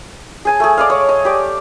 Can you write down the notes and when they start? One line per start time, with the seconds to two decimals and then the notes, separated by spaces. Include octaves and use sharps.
0.45 G#4 G#5 A5
0.60 A3 G#4
0.77 D5 D#5 F5
0.90 C#5
1.09 D#5
1.25 G4 D5